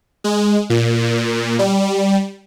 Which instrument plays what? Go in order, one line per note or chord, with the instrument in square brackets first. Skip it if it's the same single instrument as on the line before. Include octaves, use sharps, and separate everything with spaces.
[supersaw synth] G#3
A#2
G3